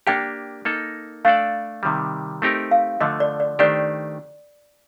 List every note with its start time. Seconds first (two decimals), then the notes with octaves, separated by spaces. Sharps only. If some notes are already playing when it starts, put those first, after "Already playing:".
0.07 A#3 D4 G4 G5
0.65 A#3 D#4 A4
1.25 A3 D4 A4 D5 F5
1.83 C3 D#3 G3
2.42 A3 C4 D#4 G4 A#4
2.71 F5
3.01 D3 F3 A3 D#5
3.20 D5
3.40 D5
3.59 D#3 A3 D4 G4 C5 D5